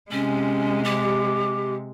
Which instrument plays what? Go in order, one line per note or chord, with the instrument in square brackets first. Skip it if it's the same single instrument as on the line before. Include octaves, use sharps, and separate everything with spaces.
[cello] C3 G#3 [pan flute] C#4
[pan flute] G4